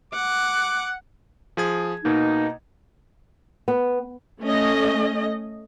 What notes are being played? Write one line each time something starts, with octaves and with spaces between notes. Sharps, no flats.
F#5 D6
F3 G#4 G#6
B2 A#3 D#4
B3
A3 C#4 D#5